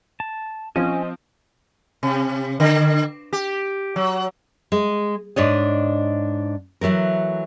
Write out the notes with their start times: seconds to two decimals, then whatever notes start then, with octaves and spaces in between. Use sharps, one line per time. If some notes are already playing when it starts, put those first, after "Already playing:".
0.20 A5
0.76 F3 C4 C#4 D#5
2.03 C3
2.60 D3
3.33 G4
3.96 F#3
4.72 G#3
5.36 G#2 D4 C#5 D#5
6.81 E3 F#3 A3 A#4